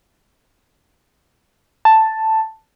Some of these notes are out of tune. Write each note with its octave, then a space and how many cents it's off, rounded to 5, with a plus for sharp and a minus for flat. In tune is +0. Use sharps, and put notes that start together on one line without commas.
A5 +5